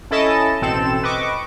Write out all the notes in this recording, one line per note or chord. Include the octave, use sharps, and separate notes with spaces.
C#4 E4 A4 D#5 A5 E7
A1 B2 C4 A4 E7
B4 D#5 C#6 D6